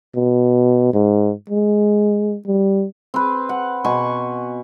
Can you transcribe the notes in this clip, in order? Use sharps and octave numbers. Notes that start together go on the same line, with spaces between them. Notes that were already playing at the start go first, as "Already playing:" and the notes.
B2
G#2
G#3
G3
C4 B4
F#5
B2 G#5 C6 C#6